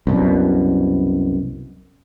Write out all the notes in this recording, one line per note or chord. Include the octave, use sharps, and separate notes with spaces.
C2 F#2 B2